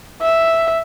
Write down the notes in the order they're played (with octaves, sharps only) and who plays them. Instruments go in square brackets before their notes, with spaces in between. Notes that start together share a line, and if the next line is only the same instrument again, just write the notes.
[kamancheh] E5